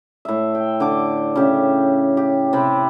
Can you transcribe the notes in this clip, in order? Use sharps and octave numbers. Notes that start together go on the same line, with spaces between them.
A2 E5
G5
D3 D5 D6
C#3 G4 E5
G4
C3 C4 B5